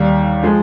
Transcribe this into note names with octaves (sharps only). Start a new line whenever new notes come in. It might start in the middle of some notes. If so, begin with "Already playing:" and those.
Already playing: D#2 D#3 G3 F5
F3 G#3